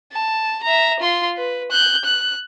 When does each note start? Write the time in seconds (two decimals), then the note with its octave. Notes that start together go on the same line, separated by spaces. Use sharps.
0.12 A5
0.63 E5 A#5
1.00 F4 C6
1.37 B4
1.71 F#6 G6
2.05 F#6